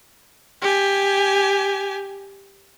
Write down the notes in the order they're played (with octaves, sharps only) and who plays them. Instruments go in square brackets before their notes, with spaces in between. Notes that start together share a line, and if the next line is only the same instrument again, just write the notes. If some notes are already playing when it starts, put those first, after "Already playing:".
[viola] G4 G#5